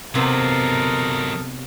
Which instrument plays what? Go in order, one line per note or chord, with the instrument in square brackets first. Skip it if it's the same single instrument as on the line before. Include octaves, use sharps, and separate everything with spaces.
[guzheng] C3 B3 [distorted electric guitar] F#3 F4 [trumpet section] D#4 A4 A#4